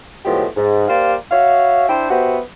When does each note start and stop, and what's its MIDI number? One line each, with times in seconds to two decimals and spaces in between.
0.25 0.45 45
0.25 0.45 53
0.25 0.45 54
0.25 0.45 56
0.25 0.45 59
0.25 0.45 67
0.57 0.88 44
0.89 1.15 58
0.89 1.15 67
0.89 1.15 72
0.89 1.15 74
0.89 1.15 77
1.31 1.87 66
1.31 1.87 73
1.31 1.87 76
1.31 1.87 77
1.88 2.08 62
1.88 2.08 64
1.88 2.08 72
1.88 2.08 79
2.10 2.38 59
2.10 2.38 66
2.10 2.38 67
2.10 2.38 72
2.10 2.38 76
2.10 2.38 78